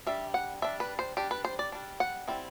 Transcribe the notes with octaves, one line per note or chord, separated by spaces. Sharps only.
G3 D4 E5
F#5
G3 D4 E5
B4
C5
G3 D4 G4
B4
C5
D5
G3 D4
F#5
G3 C4 E4